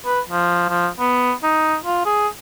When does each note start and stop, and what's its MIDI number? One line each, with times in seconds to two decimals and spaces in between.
0.06 0.21 71
0.29 0.67 53
0.69 0.89 53
0.99 1.33 59
1.43 1.77 63
1.85 2.05 65
2.06 2.28 68